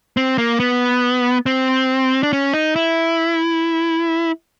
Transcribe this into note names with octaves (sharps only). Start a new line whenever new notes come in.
C4
A#3
B3
C4
D4
C#4
D#4
E4